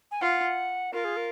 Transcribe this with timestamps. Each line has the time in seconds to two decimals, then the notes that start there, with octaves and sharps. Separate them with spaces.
0.11 G#5
0.21 F4 F#5
0.93 F4 A#4
1.05 G#4
1.17 A#4